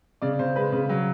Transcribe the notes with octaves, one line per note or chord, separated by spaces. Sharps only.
C#3 D5
C#3 C5
G#3 B4
C#3
F#3